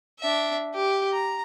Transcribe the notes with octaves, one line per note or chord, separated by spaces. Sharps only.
D4 E5
G4
A#5